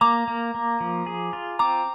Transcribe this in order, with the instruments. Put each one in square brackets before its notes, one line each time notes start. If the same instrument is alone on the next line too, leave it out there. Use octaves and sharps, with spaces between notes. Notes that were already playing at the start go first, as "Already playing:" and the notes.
[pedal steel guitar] A#3 [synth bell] A#5 D6
[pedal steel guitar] A#3
A#3
F3
G#4
F4
[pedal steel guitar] C4 [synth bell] A#5 D6